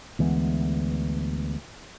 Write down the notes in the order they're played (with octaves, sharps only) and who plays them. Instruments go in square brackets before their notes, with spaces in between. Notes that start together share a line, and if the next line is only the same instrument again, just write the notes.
[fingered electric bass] D2 E3 G#3 B3